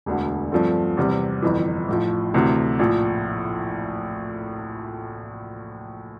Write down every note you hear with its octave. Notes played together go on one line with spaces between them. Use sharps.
E1 D2 D3
G2 F3 A3 C4
E2 C3 E3 G3 C4
G1 F2 E3
A1 A2 F3
D2 C3 E3
A#1 A2 F3